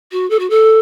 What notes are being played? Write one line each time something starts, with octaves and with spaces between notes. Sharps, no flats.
F#4
A4
F#4
A4